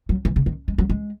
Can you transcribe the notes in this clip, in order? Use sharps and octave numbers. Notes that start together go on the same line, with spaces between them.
F#3
E3
C#3
D#3
G#3
F#3
G#3